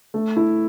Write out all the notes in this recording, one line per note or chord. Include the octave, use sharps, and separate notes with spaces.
A3
E4